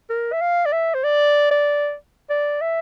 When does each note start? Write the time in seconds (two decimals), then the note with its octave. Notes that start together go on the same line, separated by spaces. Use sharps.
0.10 A#4
0.33 E5
0.41 F5
0.66 D5
0.73 E5
0.94 C5
1.04 D5
1.51 D5
2.30 D5
2.62 E5